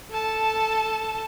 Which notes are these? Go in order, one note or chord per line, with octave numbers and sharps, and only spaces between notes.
A4 A5